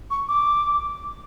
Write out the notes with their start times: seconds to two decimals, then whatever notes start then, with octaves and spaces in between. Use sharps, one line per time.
0.10 C#6
0.29 D6